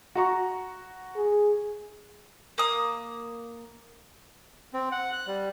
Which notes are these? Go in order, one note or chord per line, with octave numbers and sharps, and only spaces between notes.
F#4 A#5 C#6
G#4
A#3 D#6
C4
F#5
F#6
G3